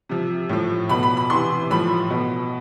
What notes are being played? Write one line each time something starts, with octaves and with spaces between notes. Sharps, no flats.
C3 F3
A2 F3
B2 B5
B5
B5
C3 E3 C6
A2 F3 B5
B2